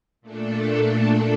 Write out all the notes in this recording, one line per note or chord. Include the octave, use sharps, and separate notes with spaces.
A#2 A3 D4 A4